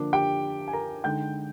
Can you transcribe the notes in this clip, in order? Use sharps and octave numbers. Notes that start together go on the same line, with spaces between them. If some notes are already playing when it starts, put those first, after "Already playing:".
Already playing: D3 F3 A#3 D4
G4 G5
G#5
A#4 A#5
D3 G#3 D#4 G5 G6